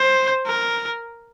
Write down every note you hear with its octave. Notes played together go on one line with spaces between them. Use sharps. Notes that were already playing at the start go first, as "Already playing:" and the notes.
Already playing: C5
A#4